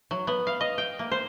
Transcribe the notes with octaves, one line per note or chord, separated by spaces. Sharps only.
F#3
B3
F5
D#5
G5
A#3
C5